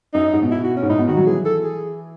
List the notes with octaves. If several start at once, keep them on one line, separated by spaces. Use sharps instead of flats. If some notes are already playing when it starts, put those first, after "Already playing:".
F#2 D#4
G#2
B2
E4
F#4
C#4
G#2
A2 D#4
B2
D#3 F#4
F#3
E3 G#4
A4
G#4